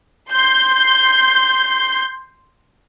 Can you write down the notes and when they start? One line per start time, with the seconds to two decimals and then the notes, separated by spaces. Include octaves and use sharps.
0.31 C6 G6 C7